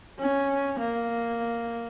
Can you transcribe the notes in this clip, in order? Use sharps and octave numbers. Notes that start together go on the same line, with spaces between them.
C#4
A#3